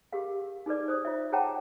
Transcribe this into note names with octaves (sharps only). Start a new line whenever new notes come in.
G4 G#4 A#4 F5
D#4 G#4 A4 B4 D5
C5 D#6
F4 C#5 E5
G#4 C#5 F#5 G5 A5 A#5